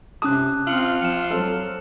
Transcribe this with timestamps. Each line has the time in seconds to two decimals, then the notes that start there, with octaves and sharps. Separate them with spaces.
0.22 C3 C#4 A5 D6 D#6 F#6
0.67 C4 F4 F6 C#7 F#7
1.02 F3 C#7 E7
1.31 F#3 C4 A4